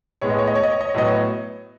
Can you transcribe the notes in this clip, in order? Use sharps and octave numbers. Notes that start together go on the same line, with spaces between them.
A2 G#3 B3 C#5
D#5
C#5
D#5
C#5
D#5
C#5
D#5
C#5
A2 F#3 B3 D#5
C#5